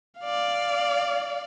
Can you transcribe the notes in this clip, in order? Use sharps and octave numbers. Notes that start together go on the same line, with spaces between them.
D5 F5